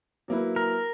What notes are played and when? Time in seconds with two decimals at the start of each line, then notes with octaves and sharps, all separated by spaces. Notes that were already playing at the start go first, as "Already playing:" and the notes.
0.28 F#3 A#3 E4 B4
0.56 A#4